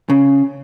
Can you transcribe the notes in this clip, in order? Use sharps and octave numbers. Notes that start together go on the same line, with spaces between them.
C#3